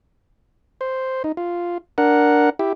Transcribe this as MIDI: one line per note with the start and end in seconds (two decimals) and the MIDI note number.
0.81 1.23 72
1.24 1.32 63
1.37 1.78 65
1.98 2.50 62
1.98 2.50 70
1.98 2.50 78
2.59 2.73 64
2.59 2.73 67